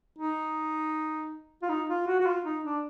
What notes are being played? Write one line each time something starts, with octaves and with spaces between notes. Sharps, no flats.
D#4
F4
D#4
F4
F#4
F#4
F4
D#4
D4